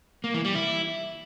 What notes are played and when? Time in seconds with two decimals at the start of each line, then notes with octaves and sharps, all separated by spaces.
0.24 A#3
0.34 E3
0.45 G3
0.55 E4